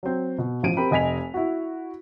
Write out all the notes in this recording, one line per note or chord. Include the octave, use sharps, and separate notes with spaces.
F#3 C4
B2
A1 F3 D7 D#7
C4 G4 A#4 B5
F1 D#5 G#5 B6 F7
E4 F#4